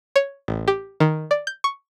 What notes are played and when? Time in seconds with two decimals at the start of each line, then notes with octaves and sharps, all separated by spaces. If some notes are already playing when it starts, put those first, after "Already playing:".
0.16 C#5
0.48 A1
0.68 G4
1.00 D#3
1.31 D5
1.47 G6
1.64 C#6